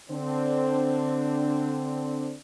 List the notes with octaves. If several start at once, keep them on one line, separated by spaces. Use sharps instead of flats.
D3 C4 D4